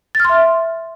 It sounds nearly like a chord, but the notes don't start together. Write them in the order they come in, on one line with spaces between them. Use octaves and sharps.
A6 F6 C6 E5